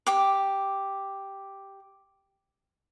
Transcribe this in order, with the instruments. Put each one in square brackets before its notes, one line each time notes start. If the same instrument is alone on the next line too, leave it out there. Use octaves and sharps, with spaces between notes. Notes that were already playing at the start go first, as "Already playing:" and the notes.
[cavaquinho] G4 D6